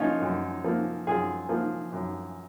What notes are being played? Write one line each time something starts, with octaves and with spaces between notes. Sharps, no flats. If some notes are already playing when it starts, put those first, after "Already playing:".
Already playing: F3 A#3 C#4 D#4 F4
F#2
F3 A#3
F#2 F4 G#4
F3 A#3
F#2